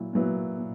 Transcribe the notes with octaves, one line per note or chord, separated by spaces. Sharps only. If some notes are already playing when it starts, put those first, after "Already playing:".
Already playing: A#2 F#3 E4
A#2 F#3 B3 E4
A#2